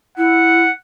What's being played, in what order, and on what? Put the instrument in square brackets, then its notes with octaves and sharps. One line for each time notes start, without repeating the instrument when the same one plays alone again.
[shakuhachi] E4 [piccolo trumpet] F#5